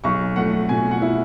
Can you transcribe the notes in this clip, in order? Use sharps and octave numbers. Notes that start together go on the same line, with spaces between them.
B1 C#6
A3 F#5
B2 G#5
F#5
E4